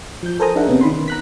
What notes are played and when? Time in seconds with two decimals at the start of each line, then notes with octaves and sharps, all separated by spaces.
0.23 F3 G6
0.40 A4 A#4 C5 G#5 A#5 D#6
0.56 D4 D#4 G#4 A#4 E5 F#5
0.67 C3 B3 C#4
0.81 D#3 B5 C6
1.08 A#5 F#6 B6